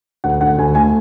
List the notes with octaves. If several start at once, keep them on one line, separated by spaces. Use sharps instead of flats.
D2 F#5
D3 F#5
D2 G#5
A3 G#5